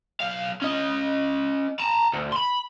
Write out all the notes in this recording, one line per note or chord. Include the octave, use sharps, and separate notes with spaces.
B1 F5
C#4 D#5
A5 A#5
D2
B5 C6